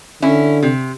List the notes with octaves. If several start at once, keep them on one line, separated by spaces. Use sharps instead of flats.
D3 C#4 E4
C3